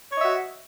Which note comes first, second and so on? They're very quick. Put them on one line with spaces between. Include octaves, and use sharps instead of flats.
C#5 D#5 E5 F#4